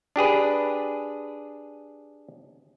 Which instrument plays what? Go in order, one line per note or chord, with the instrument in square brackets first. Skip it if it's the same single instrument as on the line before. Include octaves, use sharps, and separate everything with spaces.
[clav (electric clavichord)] D4 G4 G#4 B4